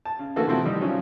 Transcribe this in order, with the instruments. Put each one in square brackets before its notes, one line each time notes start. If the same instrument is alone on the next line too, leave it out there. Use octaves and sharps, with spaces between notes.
[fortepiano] A5
C#3
D3 E3 A3 A#3 F#4 A4
C3 F3 A3 C4 E4 F#4
D#3 G3 D#4
C#3 F3 F#3 C#4